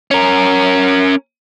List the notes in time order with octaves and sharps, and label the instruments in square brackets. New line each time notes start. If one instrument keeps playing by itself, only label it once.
[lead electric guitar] C#4 A#4